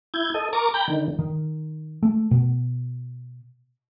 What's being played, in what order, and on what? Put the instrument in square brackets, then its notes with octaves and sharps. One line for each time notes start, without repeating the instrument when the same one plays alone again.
[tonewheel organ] E4 G6 G#6
A4 D#5
A#4 A#5 C#6 D6
G5 A#5 B5 G6
D3 D#3
[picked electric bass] D#3
A3
B2